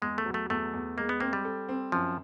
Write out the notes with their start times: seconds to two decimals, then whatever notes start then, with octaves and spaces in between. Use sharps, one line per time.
0.02 E2 G#3
0.18 A3
0.25 F#3
0.34 A3
0.50 E2 A3
0.73 E2
0.97 G#3 A#3
1.09 B3
1.20 A#3 C4
1.33 G3
1.45 A4
1.69 C4
1.92 F#2 F3